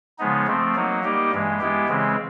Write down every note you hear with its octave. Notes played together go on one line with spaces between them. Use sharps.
C#3 F3 G#3 B3 D#4
F3 A3 C4
F#3 A#3 D#4
G3 A#3 D#4 G4
G2 E3 G#3
G#3 B3 E4 G4
C#3 E3 G#3 C4